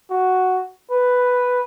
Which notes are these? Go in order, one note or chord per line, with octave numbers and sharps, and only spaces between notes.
F#4
B4